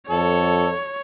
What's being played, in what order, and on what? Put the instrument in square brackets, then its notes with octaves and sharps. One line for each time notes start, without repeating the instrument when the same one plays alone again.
[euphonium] F2 [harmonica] A4 [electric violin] C#5